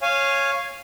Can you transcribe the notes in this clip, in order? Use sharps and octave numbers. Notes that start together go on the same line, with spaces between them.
C#5 F5 G#5